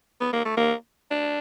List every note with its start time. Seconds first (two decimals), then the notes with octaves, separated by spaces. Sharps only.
0.21 B3
0.33 A#3
0.45 A3
0.57 A#3
1.11 D4